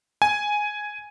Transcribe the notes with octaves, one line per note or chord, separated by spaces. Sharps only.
G#5